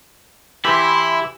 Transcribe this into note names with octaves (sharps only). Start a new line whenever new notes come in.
E3 E4 G4 E5 C6